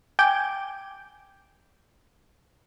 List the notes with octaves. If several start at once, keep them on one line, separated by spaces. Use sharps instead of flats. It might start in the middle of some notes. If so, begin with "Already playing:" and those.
G5 G#5 D6 G6